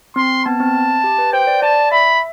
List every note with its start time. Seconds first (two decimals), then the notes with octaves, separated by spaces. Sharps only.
0.16 C4 C6
0.46 B3 A5
0.60 C4
1.04 G4
1.18 B4
1.33 C5 G5
1.47 D5
1.62 D5 A5
1.91 E5 B5
2.06 E5